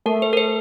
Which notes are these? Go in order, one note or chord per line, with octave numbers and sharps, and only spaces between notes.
A3 A#4
C5
A#4
C5